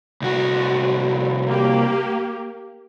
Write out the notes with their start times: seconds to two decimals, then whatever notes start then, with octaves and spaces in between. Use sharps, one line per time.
0.22 C2 F#4
1.48 A#3 G4